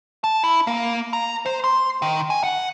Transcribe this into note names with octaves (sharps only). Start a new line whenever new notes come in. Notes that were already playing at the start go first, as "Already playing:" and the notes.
A5
E4
A#3
A#5
C5
C6
D#3
G#5
F#5